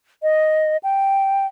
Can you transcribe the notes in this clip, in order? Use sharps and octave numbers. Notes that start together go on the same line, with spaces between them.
D#5
G5